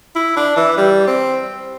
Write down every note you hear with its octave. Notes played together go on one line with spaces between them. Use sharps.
E4
D4
E3
G3
C4